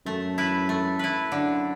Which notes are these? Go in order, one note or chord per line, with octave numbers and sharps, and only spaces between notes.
F#2 A3
E4 B4
A3
E4 B4
F#2 D3